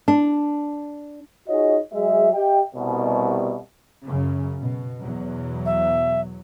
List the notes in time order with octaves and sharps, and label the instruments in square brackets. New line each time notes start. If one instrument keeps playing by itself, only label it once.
[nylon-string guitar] D4
[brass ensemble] D#4 F4 F#4 G#4 C#5 D#5
F#3 G#3 G#4 E5
G4 D#5 E5 G5
C2 B2
[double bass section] F#2 C#3
B2
E2 B2 F#3
[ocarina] E5